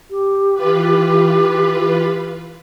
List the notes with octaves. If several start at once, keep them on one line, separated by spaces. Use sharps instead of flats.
G4
E3 F4 B4